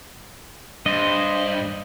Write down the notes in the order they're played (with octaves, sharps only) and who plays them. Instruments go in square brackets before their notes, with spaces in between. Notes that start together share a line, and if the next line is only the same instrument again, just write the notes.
[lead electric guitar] G2 [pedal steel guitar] C5 D#5